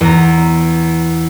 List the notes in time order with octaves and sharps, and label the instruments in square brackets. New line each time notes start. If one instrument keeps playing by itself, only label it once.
[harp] E2 A#5